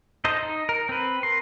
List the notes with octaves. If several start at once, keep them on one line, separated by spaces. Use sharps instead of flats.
D#4 A4 C5 D#5
D#4
A#4
C4 B4
A#4 C6